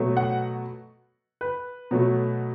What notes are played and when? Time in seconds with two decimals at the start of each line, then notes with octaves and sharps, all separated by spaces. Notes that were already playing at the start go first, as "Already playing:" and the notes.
Already playing: B2 F#3 A3
0.17 F#5
1.41 B4
1.91 B2 F#3 A3